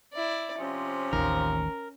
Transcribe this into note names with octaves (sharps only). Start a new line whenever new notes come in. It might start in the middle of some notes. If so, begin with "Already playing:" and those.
E4 D5
C3 F3 C#4
A1 D#2 D#3 A#4